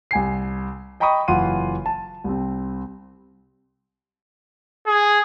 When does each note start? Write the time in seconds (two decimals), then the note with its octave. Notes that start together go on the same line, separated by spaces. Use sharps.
0.11 C2 G#5 C7
1.00 D#5 G5 A#5 B5 C#6 D#6
1.28 F#1 E3 F4 F#5 C6 D#7
1.86 A5
2.24 C2 C4
4.87 G#4